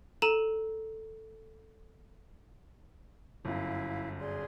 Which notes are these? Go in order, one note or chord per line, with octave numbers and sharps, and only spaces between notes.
A4 A#5 D#7 E7
G1 F#2 E4 F5
G#4 D5 C6